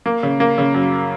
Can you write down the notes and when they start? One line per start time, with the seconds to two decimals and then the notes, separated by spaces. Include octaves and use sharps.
0.06 A#3
0.23 C#3
0.40 A#3
0.58 C#3
0.74 F#2